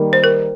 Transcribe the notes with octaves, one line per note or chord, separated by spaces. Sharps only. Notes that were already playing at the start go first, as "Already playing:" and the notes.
Already playing: D#3 G3 A#3
C5
A#4